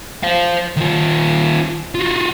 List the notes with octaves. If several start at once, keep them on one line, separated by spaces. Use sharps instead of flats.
C5 F5
D#3 F4
F4 F#4